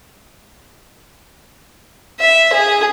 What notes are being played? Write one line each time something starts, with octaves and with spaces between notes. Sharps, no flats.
E5
G#4